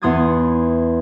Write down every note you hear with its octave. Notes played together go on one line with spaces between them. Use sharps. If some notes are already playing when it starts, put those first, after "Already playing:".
E2 B3 C6 D#6 G#6 A6